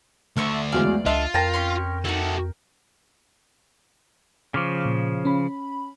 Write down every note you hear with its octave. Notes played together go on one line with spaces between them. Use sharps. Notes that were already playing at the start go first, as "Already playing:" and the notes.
D2 D3 A3 D4 E5 C#6
E2 F#3 G#3 D5 F5
C#2 D4 F4 A4 D#5 E5
F2 A#4 G5 A5 A#6
C#4 C#5 C6
D#4 E4 F#4 A4
C#3 F3 C#6 D6 F6
A#2
C#4 B5